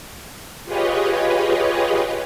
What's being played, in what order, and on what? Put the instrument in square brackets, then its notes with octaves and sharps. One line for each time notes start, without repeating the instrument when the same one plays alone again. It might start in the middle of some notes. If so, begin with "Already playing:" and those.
[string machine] F4 G4 G#4 B4 C#5 D#5